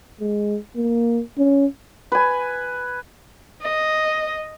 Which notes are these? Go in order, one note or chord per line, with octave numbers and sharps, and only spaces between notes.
G#3
A#3
C#4
B4 G#5
D#5